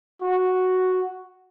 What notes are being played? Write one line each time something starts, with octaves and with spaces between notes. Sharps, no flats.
F#4